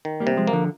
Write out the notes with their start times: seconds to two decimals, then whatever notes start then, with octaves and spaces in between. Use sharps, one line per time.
0.05 D#3
0.20 G3 A#3
0.27 C3
0.37 F3 G#3
0.47 A#3
0.53 D3 F3